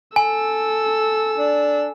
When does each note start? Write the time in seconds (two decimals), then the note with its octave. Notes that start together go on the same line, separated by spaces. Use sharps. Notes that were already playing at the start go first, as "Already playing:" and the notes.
0.16 A4 G#5 E6
1.38 D4